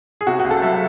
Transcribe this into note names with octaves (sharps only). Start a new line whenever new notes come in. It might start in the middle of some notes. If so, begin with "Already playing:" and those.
G#4
C3 F#4
F#4
C#2
A4
F#3 E5